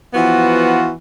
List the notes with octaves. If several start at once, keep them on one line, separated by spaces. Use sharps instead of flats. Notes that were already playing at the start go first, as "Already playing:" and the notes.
E3 F3 B3 F4 F#4